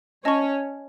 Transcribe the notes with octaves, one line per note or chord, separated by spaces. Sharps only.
C#4 C#5 D#5 A5 C#6